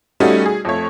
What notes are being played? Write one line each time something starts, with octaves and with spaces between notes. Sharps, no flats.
G3 A3 C#4 D#4 F#4
G#4
F2 A3 C#5